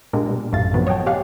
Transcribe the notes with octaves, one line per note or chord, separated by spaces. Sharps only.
A#2 G#3 A#3 D4 G4
B2 G3
A1 F#2 A2 A3 F5 A6
C3 D#3 F3 F#3 B3
C#5 D#5 F#5 G5 A5
G4 C#5 D5 F5 F#5 G#5